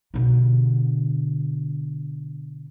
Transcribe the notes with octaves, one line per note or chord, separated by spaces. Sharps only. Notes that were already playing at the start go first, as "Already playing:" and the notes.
B2 D3